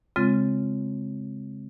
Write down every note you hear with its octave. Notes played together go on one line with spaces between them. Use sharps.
C#3 G#3 C4 F4 A6